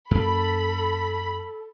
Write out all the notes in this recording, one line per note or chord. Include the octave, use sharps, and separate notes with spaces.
F#2 A#3 A4 B5